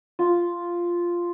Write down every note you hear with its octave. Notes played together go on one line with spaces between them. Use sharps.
F4